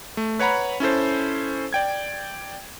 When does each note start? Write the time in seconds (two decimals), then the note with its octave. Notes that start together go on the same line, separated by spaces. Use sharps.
0.17 A3
0.39 B4 C#5 F#5 A#5 B5
0.80 C#4 E4 A4 C5
1.73 D5 G5 G#6